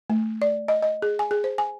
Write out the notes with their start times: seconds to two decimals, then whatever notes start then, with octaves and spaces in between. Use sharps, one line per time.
0.10 A3
0.42 D5
0.68 D#5
0.82 D#5
1.02 G#4
1.19 G#5
1.31 G#4
1.44 C5
1.58 G#5